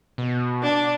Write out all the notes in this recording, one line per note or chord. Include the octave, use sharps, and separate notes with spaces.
B2
D4